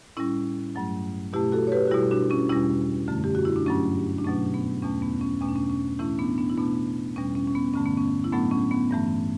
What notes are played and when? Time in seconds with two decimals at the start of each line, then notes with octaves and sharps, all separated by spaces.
0.17 A2 G3 C#4 E4
0.75 G2 F#3 A3
1.33 B2 A3 E4 G4
1.52 F#4 A4
1.67 C#5
1.72 G4 B4
1.88 F#4
1.91 B2 G3 E4 G4
2.11 D4 F#4
2.30 C#4 E4
2.49 E2 B2 G3 C#4 E4
3.08 F#2 D3 A3
3.24 G4
3.35 F#4
3.45 E4
3.56 D4
3.66 G2 F#3 A3 C#4
4.18 D4
4.25 B2 F#3 A3 C#4
4.54 B3
4.82 E2 B2 A3 C#4
5.02 B3
5.21 C#4
5.41 E2 B2 A3 C#4
5.49 D4
5.56 C#4
5.70 C#4
5.99 A2 E3 A3 C#4 E4
6.19 B3 D4
6.38 B3 D4
6.50 E4
6.57 B2 A3 B3 D4
7.16 E2 B2 G3 C#4
7.35 C#4
7.47 C#4
7.55 B3
7.74 G2 D3 A3 C#4
7.86 B3
7.97 C#4
8.24 E4
8.32 A2 F#3 A3 B3 D4
8.51 C#4
8.71 B3
8.90 G2 E3 A3